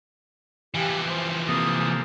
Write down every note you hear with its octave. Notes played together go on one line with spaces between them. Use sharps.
E3 F3 G4
C5
C3 A#3 A4 D#6